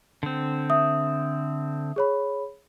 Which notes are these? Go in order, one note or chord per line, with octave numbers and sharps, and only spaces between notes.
D3 C4
E5 D#6
G#4 C#5 B5